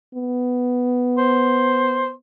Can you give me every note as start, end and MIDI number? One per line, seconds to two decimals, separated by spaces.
0.15 2.15 59
1.18 2.10 72